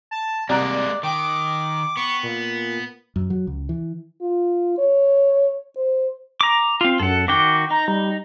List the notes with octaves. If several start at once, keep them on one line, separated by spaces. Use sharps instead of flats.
A5
C2 G#3 A#3 D5 A#5 F#6
D#3 G5 D6
B3 C#6
A#2
F#2
F#3
C#2
E3
F4
C#5
C5
A#5 D6
C4 F4
F#2 A4 F#5
D#3 F#4 G5 D6
D#4 A#5
G3